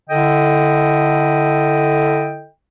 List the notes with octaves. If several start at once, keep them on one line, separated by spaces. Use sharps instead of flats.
D3 E4 A4 D#5 G5